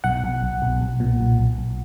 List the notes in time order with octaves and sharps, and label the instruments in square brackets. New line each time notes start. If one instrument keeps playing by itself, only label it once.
[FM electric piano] B1 F#5
B1
B1
B1
B1
A#2
B1
B1
B1